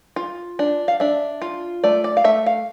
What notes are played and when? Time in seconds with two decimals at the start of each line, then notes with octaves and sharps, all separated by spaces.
0.16 F4
0.59 D4
0.88 F5
1.00 D4 E5
1.42 F4
1.84 A3 D5
2.04 D5
2.17 F5
2.24 A3 E5
2.46 F5